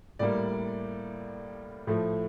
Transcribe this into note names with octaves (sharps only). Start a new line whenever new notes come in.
A2 G3 A#3 D5
A2 F3 A3